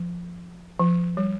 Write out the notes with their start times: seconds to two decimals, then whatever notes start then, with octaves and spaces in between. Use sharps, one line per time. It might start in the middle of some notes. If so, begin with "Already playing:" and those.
Already playing: F3
0.80 F3
1.17 G3